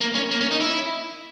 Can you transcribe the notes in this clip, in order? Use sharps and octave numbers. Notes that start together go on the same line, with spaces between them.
A#3
C#4
A#3
C#4
D#4
E4